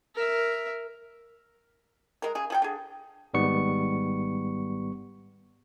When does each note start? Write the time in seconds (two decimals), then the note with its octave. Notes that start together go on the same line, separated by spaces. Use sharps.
0.15 A#4 E5
2.22 G#3 A#4
2.35 C#3 G#4
2.50 F3 G#4 G5
2.62 D3 G#4
3.34 G#1 G#2 G3 B3 C#6 C#7